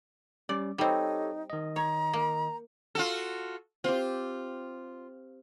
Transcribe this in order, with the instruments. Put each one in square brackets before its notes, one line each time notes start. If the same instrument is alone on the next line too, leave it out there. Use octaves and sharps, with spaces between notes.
[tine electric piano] G3 C#4 [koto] D5
[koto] G3 C4 [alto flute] D#4 [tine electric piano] G4 A4 C#5
[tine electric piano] D#3 D#5
[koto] C#5 [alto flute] A#5
[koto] A#3
[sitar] F4 F#4 A4
[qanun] C4 G4 [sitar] F4